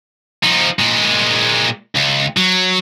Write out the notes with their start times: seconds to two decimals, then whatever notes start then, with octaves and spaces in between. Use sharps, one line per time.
0.43 F3 D#4
0.79 A#2 G#3
1.96 C#2
2.37 F#3